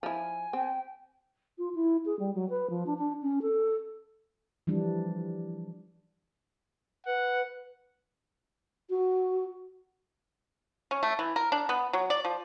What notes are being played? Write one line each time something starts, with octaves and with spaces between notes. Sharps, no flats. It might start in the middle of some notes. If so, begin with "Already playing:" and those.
F3 E4 G#5
C4 G5
F4
E4
G#4
G3
F#3
B4
F3
D4
D4
C#4
A4
E3 F3 G3 D4
B4 F#5
F#4
C#4
A3
E3
A#4
D4
B3
F#3
D5
F3